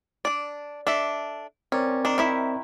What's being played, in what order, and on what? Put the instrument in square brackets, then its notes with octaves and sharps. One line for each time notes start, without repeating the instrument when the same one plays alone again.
[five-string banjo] D4 D5
D4 A4 E5
[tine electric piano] C4 A#4 D5 [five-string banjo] C#4
[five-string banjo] D#3 D4
D#3 E4 E5